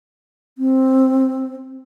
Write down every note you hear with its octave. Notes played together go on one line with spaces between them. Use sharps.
C4